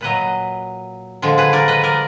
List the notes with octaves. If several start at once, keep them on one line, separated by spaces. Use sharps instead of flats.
A#2 F#3 B4 D#5
D3 F3 G#3
G#4 B4
A#4 D5
B4 D#5
A#4 D5